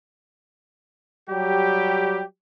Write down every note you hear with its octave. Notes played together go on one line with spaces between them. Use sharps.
F#3 G3 G4